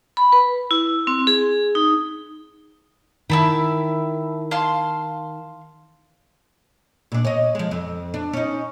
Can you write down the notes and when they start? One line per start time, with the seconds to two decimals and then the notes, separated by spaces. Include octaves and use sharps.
0.17 B5
0.32 B4
0.71 E4
1.07 C4
1.27 G#4
1.75 D#4
3.30 D#3 E4 A5 B5
4.51 F5 A5 C6
7.12 A#2 D4
7.25 C#5 D#5
7.55 F3 G#3
7.71 F2
8.14 D4
8.33 C#4 D#4